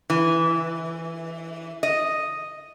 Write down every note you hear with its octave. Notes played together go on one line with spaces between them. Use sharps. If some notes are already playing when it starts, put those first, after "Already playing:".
E3
D#5